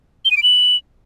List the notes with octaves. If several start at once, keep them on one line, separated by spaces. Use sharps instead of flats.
G7
D#7
D7
F#7